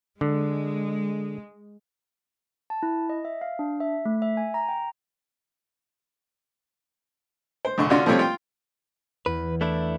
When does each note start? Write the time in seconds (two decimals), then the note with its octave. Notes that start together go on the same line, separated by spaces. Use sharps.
0.21 D3 G#3
2.70 A5
2.83 E4
3.10 D#5
3.25 E5
3.41 F5
3.59 D4
3.80 E5
4.05 A3
4.22 E5
4.37 G#5
4.54 A#5
4.69 G5
7.65 C5
7.78 A#1 D3 C#6
7.90 D3 C#4 D4 F4 F#4
8.06 F3 G3 A3 C4 F4 C#5
8.19 F4 G5
9.26 E2 B4
9.61 A3 D4 E4